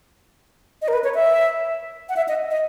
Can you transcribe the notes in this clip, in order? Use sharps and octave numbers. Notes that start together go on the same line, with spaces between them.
D#5
A#4
B4
C#5
E5
F#5
E5
D#5
D#5